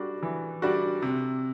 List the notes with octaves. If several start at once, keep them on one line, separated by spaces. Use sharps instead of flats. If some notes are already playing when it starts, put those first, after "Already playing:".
Already playing: G3 D4 F#4
E3
G3 D4 F#4
C3